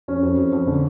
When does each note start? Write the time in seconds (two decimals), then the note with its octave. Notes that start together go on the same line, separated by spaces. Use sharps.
0.08 F2 C#4
0.23 F2
0.37 F2
0.52 F2
0.67 D3